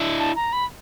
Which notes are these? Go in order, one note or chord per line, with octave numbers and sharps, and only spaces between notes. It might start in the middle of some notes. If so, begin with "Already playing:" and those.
Already playing: D4 E4
A5
A#5
B5